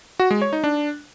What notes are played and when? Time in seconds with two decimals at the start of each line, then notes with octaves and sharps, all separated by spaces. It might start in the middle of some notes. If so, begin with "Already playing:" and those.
0.20 F#4
0.31 G#3
0.42 C#5
0.53 D#4
0.64 D4